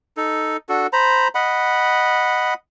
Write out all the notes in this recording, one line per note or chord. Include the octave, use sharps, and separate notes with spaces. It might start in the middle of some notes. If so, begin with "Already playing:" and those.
D#4 A4
D4 F#4 A4
C5 A#5 B5
D#5 F#5 B5